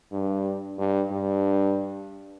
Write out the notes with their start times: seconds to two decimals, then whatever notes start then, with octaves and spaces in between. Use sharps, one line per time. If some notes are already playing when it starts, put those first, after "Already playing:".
0.12 G2
0.78 G2
1.11 G2